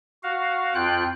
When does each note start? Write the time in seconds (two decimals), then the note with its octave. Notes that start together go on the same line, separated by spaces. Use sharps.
0.23 F#4 F5
0.75 F2 F4 G5 F#6